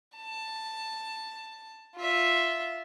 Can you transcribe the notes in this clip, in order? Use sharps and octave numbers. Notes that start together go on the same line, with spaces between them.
A5
F4 E5